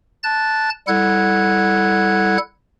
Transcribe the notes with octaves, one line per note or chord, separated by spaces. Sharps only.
A5 F#6 A6
G3 E4 A4 F#5 F#6 G#6